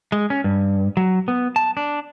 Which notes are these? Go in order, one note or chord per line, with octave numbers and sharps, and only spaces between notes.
G#3
C#4
G2
F#3
B3
A5
D4